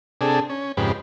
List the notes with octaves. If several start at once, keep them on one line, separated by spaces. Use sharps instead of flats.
C3 D4 G#4 A4
C#4
F2 G#2 C#3 G4 B4